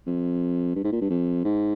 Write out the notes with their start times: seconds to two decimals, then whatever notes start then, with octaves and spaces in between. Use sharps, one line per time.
0.07 F2
0.75 G2
0.84 G#2
0.92 A#2
1.01 G2
1.10 F2
1.44 G#2